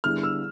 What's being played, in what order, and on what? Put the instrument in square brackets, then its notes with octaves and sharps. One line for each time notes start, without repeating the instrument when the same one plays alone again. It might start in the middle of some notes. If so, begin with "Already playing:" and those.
[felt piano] D3 G3 B3 E4 G#4 [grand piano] F6
[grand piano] E6